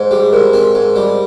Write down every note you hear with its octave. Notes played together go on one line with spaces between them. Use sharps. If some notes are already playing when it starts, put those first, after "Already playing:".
Already playing: G#2 C5
G3 G#4
G#2 A#4
C4
G#2
G3